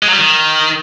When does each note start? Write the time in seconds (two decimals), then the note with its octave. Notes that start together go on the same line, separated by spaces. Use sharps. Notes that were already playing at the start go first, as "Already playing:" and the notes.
0.03 G#3
0.08 F#3
0.13 G3
0.18 D#3